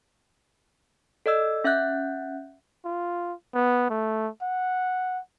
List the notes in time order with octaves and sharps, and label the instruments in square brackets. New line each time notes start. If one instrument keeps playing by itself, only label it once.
[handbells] A4 D5 D#5 E6
C#4 E5 F#5 F#6 G6
[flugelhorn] F4
B3
A3
F#5